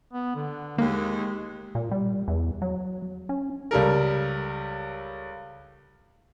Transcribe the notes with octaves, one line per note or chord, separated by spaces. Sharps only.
B3
D3
D#2 G#3 A#3
A#2
G3
E2
F#3
C#4
C#2 G3 A4 A#4